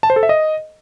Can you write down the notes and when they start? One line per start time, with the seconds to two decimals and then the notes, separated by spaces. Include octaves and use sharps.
0.03 A5
0.10 C5
0.16 A4
0.23 E5
0.29 D#5